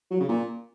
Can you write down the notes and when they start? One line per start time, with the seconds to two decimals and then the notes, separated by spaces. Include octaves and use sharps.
0.11 F#3
0.20 C#3
0.29 A#2